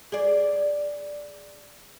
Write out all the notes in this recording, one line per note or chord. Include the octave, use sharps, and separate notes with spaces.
G#4 D5